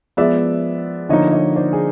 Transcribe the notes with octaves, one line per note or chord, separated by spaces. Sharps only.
F3 G#3 B3 D5 E5
D3 F3 A#3 D#4 C#5 D#5
C#5 D#5
C5 D5
G#4